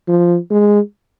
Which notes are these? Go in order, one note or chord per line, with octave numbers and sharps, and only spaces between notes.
F3
G#3